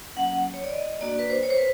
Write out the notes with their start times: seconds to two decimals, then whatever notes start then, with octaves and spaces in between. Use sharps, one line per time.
0.16 F#3 A#3 C#4 F#5
0.54 C#5
0.64 D5
0.73 D#5
1.01 A#3 D4 F#4 D5
1.19 B4
1.30 C5
1.43 C#5
1.50 C5
1.58 B4